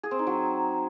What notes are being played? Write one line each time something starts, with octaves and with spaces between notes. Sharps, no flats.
G#4
C4
D#4
F#3